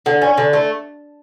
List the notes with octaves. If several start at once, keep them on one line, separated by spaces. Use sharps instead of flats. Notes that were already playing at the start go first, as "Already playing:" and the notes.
D3
C#4
D3
A3